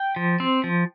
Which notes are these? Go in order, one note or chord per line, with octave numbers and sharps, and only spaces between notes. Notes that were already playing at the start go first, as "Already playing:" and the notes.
Already playing: G5
F3
C4
F3